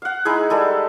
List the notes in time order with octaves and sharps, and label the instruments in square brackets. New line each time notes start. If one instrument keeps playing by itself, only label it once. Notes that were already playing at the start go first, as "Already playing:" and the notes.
[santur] F5 F#5
G#3 D#4 E4 G#4
G3 G#3 A4